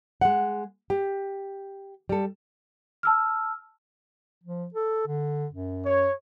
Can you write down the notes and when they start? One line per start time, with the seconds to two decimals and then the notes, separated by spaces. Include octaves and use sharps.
0.21 G#3 F#5
0.90 G4
2.09 G3 A4
3.03 A5 E6 F6
4.43 F3
4.74 A4
5.07 D3
5.52 F#2
5.86 C#5